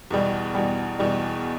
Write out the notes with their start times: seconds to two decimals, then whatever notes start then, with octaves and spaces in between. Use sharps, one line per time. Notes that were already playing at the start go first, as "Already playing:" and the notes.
0.11 E2 B2 G3
0.55 E2 B2 G3
0.99 E2 B2 G3